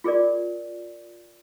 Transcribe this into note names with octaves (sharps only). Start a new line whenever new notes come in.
F4 G#4 A#4 D5